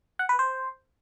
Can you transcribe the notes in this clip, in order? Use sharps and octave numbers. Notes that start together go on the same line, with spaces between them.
F#5
B4
C5